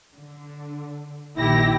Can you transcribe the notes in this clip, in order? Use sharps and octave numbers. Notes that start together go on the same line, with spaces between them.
D3
A#1 D#3 E4 G4 A#6